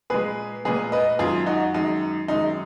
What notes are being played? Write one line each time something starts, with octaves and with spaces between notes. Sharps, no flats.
A#2 G#3 G#4 B4
A#2 G#3 G#4 B4
B4 D#5
F#2 D#3 G#3 F4 G#4
D#4 F#4
F#2 D#3 G#3 D#4
F#2 D#3 G#3 D#4